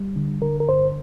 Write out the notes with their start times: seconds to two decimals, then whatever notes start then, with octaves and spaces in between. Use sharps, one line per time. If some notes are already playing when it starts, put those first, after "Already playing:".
Already playing: G3
0.16 D3
0.42 D3 A#4
0.60 A#4
0.68 G2 C5